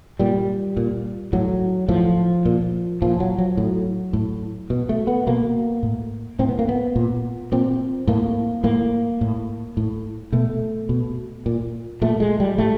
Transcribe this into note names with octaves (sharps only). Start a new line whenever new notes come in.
A#2 G3
A#2
A2 F#3
A2 F3
A#2
A#2 F3
F#3
F#3
A2
A2
B2
A3
B3
B2 A#3
A2
A2 C4
B3
A#3
B3
A#2
A#2 C4
A2 A#3
A2 A#3
A2
A2
B2 A3
B2
A#2
A#2 A3
G#3
G3
A2 A3